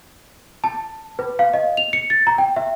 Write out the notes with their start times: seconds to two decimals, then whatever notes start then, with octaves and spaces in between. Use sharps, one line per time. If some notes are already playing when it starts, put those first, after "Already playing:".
0.64 A5
1.19 B4
1.39 F5
1.54 D#5
1.77 F7
1.93 C#7
2.10 A6
2.27 A#5
2.38 G5
2.56 E5